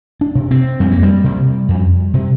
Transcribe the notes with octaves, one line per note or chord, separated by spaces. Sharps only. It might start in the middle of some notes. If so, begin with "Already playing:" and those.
D4
C3
C4
F2 G3
A#3
G3
C3
F2
C3